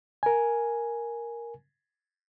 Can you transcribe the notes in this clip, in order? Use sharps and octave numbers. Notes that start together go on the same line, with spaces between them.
A#4 G#5